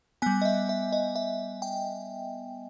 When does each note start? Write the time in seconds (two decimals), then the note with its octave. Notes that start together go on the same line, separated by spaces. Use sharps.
0.22 G3 B3 G#5
0.42 D#5
0.45 E5
0.69 E5
0.92 D#5
1.16 E5
1.62 G5